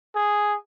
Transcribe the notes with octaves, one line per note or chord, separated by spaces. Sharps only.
G#4